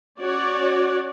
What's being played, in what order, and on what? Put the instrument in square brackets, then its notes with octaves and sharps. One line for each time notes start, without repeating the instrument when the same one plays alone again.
[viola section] C#4 F#4 C#5 D5